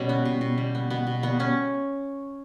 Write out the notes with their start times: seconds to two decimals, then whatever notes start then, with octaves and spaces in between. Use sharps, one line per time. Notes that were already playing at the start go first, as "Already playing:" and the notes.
Already playing: B2 G3 C#4
0.09 B3
0.25 B2
0.41 B2
0.58 G3
0.75 B3
0.90 B2 B3
1.07 B2
1.23 G3 B3
1.39 B3 C#4